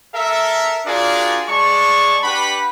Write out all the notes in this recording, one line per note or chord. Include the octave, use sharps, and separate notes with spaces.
A4 A#4 E5
D4 F4 F#4 G#4 A#4 D5
G#3 D5 A5 C#6
D4 G4 B4 F#5 B5